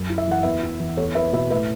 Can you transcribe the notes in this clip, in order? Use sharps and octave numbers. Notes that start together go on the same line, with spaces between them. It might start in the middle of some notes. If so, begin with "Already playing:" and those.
Already playing: F#2
E4
E5
E3 F#5
E2 B4 E5
E4
E3
E2 A4 C#5
E2 B4 E5
B2 B4 E5
A2 B4 E5